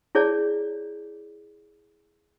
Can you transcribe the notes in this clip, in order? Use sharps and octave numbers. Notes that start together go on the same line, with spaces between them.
E4 G#4 C#5 D5 A5